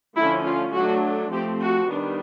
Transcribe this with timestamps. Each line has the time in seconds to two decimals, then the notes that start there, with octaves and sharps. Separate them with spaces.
0.17 D3 F3 A3 C#4 E4
0.46 F4
0.74 F#3 A3 D4 F#4
1.32 F3 A3 C4 G4
1.61 F#4
1.89 D#3 G3 B3 D4